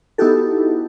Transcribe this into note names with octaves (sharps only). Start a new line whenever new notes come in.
B3 D#4 E4 F#4 G4 A4